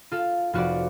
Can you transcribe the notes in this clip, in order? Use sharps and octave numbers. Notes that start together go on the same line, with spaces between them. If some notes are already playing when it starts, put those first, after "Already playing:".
F4 A4 F5
F1 F4 F#4 B4 C5 D5